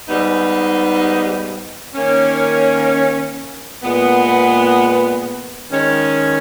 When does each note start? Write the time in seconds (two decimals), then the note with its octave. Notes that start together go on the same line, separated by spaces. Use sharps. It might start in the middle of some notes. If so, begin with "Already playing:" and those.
0.08 G#2 G3 B3 D#4
1.95 D#3 A#3 C#4
3.83 A#2 G#3 B3
5.70 D#3 G#3 C#4